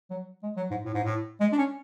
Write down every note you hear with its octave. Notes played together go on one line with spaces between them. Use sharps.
F#3
G#3
F#3
G#2
A2
G#2
A2
G#3
D4
C#4